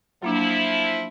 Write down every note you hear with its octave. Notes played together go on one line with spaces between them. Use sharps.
F3 F#3 A#3 D4 E4